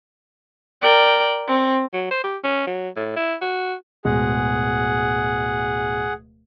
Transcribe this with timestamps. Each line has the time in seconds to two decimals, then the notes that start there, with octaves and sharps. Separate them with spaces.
0.82 A#4 D5 G5
1.47 C4
1.94 F#3
2.11 C5
2.24 G4
2.44 C#4
2.67 F#3
2.96 A2
3.17 E4
3.42 F#4
4.05 D1 B2 G#3 G#4 F#5